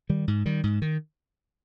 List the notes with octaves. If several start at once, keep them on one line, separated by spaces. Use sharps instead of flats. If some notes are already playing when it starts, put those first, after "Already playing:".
D#3 G3
G#2
D#3 G3
G#2
D#3